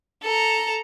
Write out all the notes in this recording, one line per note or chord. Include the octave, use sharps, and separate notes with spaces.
A4 A#5